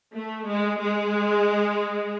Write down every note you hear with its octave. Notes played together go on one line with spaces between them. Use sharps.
A3
G#3
G#3